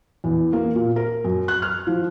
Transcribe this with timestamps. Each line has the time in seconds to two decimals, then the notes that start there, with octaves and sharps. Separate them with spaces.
0.24 E2
0.53 A#3
0.75 A#2
0.96 A#4
1.24 F#2
1.48 F#6
1.62 F6
1.87 F3